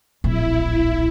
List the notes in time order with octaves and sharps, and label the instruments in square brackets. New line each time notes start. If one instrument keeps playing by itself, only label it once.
[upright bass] D1 A#1 [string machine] E4